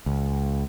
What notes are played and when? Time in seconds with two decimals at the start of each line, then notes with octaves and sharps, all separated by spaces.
0.06 C#2